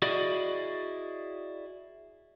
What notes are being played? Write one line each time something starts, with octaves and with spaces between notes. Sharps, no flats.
E4 F#4 G#4 D5 D#5